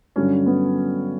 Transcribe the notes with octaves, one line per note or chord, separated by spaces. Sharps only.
G2 D3 F#3 C#4
B3